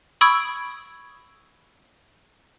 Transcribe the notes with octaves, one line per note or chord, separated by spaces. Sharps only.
B5 C#6 D#6 E6 G#6 D7